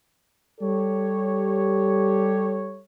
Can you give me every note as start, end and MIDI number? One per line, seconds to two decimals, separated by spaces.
0.61 2.81 55
0.61 2.81 67
0.61 2.81 69
0.61 2.81 73